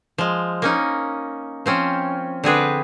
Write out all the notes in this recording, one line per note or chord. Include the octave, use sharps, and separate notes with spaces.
F3 G#3
A#3 C#4 D#4
F3 C4 C#4
D3 C4 G#4 B4